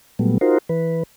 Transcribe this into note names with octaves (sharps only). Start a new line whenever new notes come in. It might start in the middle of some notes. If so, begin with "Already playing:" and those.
A#2 F#3 G3 A3 B3
D#4 F4 F#4 A#4 C5
E3 B4